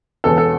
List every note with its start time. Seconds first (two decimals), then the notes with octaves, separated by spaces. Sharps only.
0.24 E1 E2 B2 A4
0.38 A4